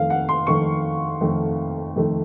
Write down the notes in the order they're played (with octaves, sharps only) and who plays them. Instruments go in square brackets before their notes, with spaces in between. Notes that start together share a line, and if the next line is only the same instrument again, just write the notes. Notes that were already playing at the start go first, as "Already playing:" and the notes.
Already playing: [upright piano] F2 D#3 A3 F5
F#5
C6
F2 D#3 A3 C#6
F2 D#3 A3
F2 D#3 A3